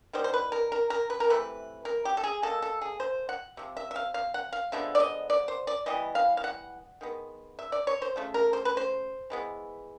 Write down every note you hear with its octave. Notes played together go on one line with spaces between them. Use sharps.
D#3 G3 B3 C5
C5
B4
A#4
A#4
A#4
B4
A#4
C3 E3 A3 B4
A#4
G4
A4
G#4
B2 G3 A#3 A4
A4
G#4
C5
F#5
C3 F3
E5
E5
F5
F5
F#5
F5
D3 F3 G#3 B3 E5
D5
D#5
D5
C5
D5
E3 G3 B3 D#5
F5
F5
F#5
D#3 G#3 B3
E5
D5
C#5
C5
C#3 F3 A3
A#4
C5
B4
C5
E3 G#3 B3